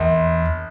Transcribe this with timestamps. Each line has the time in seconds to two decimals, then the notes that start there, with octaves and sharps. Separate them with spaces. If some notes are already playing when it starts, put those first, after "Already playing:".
Already playing: A#1 E2